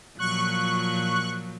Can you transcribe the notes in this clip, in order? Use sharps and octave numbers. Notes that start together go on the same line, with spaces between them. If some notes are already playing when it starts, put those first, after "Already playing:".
A#2 F3 F#3 C#6 F#6